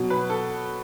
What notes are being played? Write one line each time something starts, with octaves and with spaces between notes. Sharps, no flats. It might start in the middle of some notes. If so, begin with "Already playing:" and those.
Already playing: B2 F#3
B4
A4